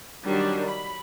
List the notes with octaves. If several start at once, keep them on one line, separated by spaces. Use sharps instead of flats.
D#3 F#3 G3 D4
B5